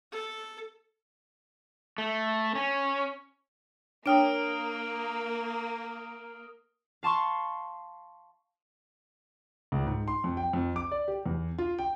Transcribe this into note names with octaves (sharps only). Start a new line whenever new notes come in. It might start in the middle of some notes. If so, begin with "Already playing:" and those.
A4
A3
C#4
A#3 D4 C#5 G5 D#6 F6 D7
F5 A5 C6 C#6
C#2
G#2
C6
F2
G5
F2
D6
D5
G4
E2
F4
G5